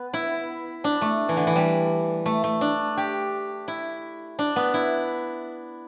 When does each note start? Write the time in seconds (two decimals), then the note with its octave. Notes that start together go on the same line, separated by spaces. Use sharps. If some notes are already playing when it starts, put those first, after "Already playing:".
Already playing: B3
0.13 E4
0.84 D4
1.02 A3
1.29 E3
1.37 D3
1.47 E3
1.56 G3
2.26 A3
2.44 A3
2.61 D4
2.97 G4
3.68 E4
4.39 D4
4.56 B3
4.74 E4